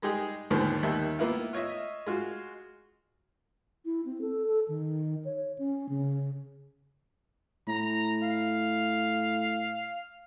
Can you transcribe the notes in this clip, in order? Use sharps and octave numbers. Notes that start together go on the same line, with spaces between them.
G3 G#3 D#4 G4 G#4
D#2 G#2 D3 D#3 F3 B3
D#2 D#3 G3 E5
A#3 B3 E4 F4
F4 C#5 D#5 E5
G#3 F4 F#4
E4
C4
A4
A4
D#3
C#5
C#4
C#3
A2 A#5
F5